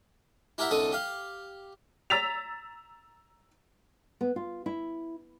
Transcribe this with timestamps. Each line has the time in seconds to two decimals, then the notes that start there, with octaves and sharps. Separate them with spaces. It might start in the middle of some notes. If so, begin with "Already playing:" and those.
0.58 E4 G4 A#4 E5 F#5
0.71 C2 D3 D4 D#4 A4 D#6
0.92 G4 F5
2.10 A#5 E6 A6 B6 F7
4.21 B3
4.36 F4
4.66 E4